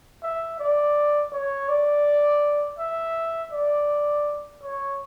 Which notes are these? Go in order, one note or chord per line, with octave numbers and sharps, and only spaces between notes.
E5
D5
C#5
D5
E5
D5
C#5